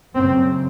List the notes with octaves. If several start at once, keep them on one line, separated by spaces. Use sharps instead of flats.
F#2 C#3 C4